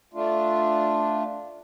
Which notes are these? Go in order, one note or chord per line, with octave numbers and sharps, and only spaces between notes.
A3 D4 F4